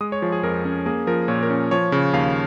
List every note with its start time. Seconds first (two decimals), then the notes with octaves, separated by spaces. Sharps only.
0.01 G#3 D#6
0.12 C#5
0.22 F3 G#4
0.32 G#4
0.43 F2 A#4
0.65 C#4
0.86 A#3 G#4
1.07 F3 A#4
1.28 A#2 C#5
1.43 A#4
1.50 C#4
1.71 F3 C#5
1.92 C#3
2.13 D#2 F5